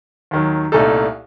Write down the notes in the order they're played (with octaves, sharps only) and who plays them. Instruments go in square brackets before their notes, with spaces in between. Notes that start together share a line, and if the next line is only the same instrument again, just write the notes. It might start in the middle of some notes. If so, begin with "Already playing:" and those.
[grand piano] D#2 D#3 F#3
C2 A#2 A3 D#4 A4